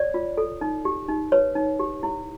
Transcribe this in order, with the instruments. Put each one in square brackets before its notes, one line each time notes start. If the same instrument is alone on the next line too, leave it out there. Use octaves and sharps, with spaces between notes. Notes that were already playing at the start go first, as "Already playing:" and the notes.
Already playing: [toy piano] C#5 D5
F4
A4
D#4
G4
D#4
B4 C#5
D#4
G4
E4